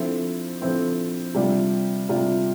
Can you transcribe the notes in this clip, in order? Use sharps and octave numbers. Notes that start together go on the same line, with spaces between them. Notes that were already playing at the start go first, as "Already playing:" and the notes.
Already playing: D3 F3 C4 E4
D3 F3 C4 E4
C3 G3 D4 F4
C3 G3 D4 F4